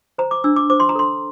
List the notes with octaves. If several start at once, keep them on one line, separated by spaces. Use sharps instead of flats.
C5 A#5
D6
D4 E6
D6
C5 D6
C6
A#5
A4 C6